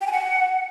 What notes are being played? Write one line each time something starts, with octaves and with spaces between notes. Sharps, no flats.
G5
G#5
F#5